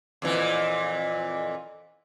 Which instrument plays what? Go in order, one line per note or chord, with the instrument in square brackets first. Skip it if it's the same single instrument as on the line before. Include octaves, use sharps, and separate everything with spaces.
[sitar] F2 A#2 E3